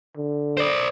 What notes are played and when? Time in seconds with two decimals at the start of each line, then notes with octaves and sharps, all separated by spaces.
0.17 D3
0.57 C5 D5